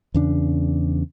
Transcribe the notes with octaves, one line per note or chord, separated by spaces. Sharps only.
E2 C#3 D4